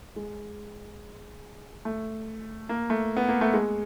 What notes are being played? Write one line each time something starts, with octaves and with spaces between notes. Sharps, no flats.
G#3
A3
A#3
A3
B3
A#3
A3
G#3